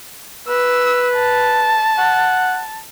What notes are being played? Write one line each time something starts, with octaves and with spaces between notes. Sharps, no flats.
B4 E6
A5
F#5